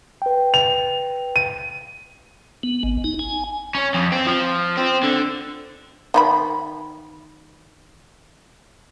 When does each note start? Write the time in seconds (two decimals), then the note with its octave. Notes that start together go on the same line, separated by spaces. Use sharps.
0.22 B4 G5
0.54 F7
1.36 D#7
2.63 B3
2.83 G#1
3.04 D#4
3.19 G#5
3.75 C#4
3.94 F2
4.12 C4
4.26 F3
4.77 C4
5.03 D3
6.14 D#3 F4 B5